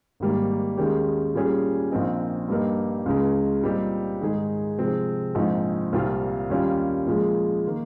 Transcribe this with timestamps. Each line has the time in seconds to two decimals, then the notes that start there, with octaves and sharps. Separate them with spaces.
0.20 G#1 G#2 D#3 G3 A#3
0.77 D#2 D#3 G#3 C#4 G4
1.34 A#2 G3 C#4 G#4
1.92 A#1 A#2 F3 C4 D#4
2.49 G2 G3 A#3 D#4 A#4
3.06 C#2 C#3 G#3
3.63 A#2 G3 C4 D#4 G4
4.21 G#2 D#3 G#3 D#4 G#4
4.78 C3 F3 G#3 C4
5.35 A#1 G#2 F3 C4 D#4
5.93 C2 A#2 G3 C4 F4
6.50 D#2 D#3 G3 C#4 F4
7.07 A#2 F3 G#3
7.67 D#3 A#3